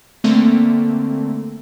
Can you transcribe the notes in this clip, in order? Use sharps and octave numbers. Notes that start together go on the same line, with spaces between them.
D3 A3 A#3 C4